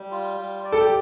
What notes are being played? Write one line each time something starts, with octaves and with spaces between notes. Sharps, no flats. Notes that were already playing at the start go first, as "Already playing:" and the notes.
Already playing: G3
F4
G3
D5
A4
G4